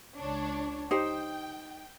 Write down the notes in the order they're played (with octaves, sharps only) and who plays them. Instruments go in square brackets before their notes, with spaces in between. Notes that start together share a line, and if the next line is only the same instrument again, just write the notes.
[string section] C#2 D4 C#5
[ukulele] D#4 G4 C5 [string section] G5